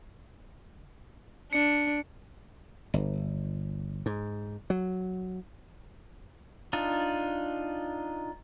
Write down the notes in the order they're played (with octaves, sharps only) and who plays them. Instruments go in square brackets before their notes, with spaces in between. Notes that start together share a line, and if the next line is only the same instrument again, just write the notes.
[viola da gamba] D4 [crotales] C#7
[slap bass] G1
G#2
F#3
[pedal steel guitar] D4 D#4 F4